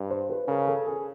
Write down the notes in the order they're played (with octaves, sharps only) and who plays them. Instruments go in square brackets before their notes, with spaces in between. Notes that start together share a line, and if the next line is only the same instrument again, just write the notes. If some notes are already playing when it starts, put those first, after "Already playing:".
Already playing: [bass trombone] G2
[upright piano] C5
B4
[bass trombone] C#3 [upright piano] A#4
[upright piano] A4
G#4